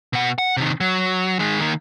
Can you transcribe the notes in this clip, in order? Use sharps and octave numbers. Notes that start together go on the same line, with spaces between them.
B2 F#5
F#5
C3 D#3
F#3
D#3 G#3
D#3 A#3